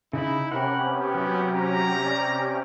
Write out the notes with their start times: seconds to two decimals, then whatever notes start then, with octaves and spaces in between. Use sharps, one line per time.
0.13 C#3 D#4 E4 B5
0.52 C3 C#4 G4 A#4 F#5 B5
0.85 B3
1.15 F#3
1.54 A#5
2.06 D5